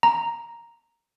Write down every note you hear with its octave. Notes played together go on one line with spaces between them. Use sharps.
A#5